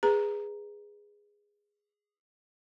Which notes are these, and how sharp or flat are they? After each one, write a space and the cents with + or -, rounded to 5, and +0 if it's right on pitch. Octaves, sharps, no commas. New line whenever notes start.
G#4 -10 B4 +0 A#5 +0